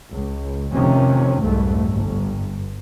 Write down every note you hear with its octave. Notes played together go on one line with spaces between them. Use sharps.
C#2
F1 C3 D#3 F3 C#4
F1 C2 F2 G#2 A3
G1